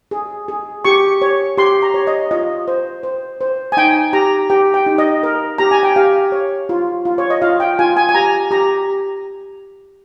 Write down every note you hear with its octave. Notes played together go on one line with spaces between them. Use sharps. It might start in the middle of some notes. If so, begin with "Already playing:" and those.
G#4
G#4
G4 C#6
C#5
G4 C6
A#5
C#5
D#5
F4 D#5
C5
C5
C5
G#5
D#4 G5
G4 A#5
G4 G5
G5
D#4
D#5
A#4
G4 A#5
G#5
G5
G4 F5
C#5
F4
F4
C#5
D#5
F4 F5
G5
F4 G#5
G#5
G#5
G4 A#5
G4 A#5